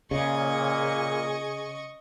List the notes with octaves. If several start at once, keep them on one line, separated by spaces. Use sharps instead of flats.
A#2 C#3 G#4 D#5 C#6